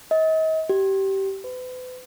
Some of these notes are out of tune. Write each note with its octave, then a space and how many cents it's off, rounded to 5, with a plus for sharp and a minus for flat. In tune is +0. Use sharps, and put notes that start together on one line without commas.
D#5 +35
G4 -20
B4 +40